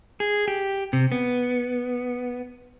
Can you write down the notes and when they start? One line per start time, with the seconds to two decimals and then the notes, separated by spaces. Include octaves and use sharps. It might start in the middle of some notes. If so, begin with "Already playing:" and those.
0.20 G#4
0.48 G4
0.93 C3
1.12 B3